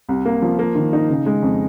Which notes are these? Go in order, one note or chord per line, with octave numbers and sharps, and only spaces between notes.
C2
A#3
F3
A#3
D#3
D#4
C#3
G#3
F2